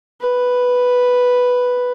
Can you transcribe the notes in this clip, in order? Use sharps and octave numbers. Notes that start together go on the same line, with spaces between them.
B4